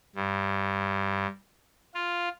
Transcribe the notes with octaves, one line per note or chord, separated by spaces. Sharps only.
G2
F4